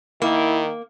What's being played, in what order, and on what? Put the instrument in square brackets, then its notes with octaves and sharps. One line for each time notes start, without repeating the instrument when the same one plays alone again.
[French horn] D#3 [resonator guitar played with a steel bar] A#3 [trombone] E4